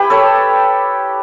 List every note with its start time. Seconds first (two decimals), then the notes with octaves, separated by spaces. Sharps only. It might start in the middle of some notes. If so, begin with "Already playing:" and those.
Already playing: E4 G4 B4
0.10 A4 C#5